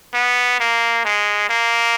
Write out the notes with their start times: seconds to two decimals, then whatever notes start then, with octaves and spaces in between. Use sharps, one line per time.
0.14 B3
0.60 A#3
1.05 G#3
1.50 A#3